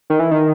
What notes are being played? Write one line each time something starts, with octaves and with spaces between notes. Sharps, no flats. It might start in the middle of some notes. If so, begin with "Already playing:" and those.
D#3
E3
D#3